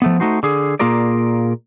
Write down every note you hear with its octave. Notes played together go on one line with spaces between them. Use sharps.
F3 A3 B3
A3 D#4 F#4 C5
D3 G#4
A#2 A#3 F4 G#4 A#4 D5